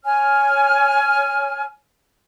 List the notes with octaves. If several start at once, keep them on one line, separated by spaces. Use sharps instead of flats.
C#5 G#5 F6